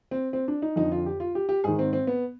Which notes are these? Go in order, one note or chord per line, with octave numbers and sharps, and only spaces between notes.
C4
C4
D4
D#4
F2 D3 D#4
F4
G4
F4
G4
G4
G#2 D#3 G#4
C4
C4
B3